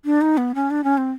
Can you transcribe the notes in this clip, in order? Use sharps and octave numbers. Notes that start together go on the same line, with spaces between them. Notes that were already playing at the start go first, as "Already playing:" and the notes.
D4
D#4
B3
C#4
D4
C#4
C4